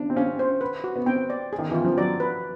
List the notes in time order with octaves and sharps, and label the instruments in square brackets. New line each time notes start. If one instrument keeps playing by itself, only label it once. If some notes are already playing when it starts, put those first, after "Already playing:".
Already playing: [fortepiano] D4
C4
[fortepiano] C#4 [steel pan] F5
[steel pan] C5
B4
F#4
[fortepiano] B3
[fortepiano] C4 [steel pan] G5
[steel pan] D5
G#4
[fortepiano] D#3
[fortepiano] E3 [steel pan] F4
[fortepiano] F3
[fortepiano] F#3 [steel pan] D5
[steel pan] B4